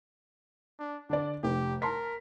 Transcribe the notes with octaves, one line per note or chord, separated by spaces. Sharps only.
D4
D3 D4 D5
F1 G4
A#4 A5 C6 B6